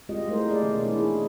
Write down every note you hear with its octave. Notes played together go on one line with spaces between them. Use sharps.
G#3 C4 F4 G4 D#5
G#3 A3 E4 A#4 C5
A#3 G#4 D5
B2 D#3 A#3 C#4
G#3 D4 E4
E3 D#4 G#4